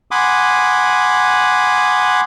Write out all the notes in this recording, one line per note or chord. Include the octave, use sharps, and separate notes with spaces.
F#5 G#5 B5 C6 D6 D#6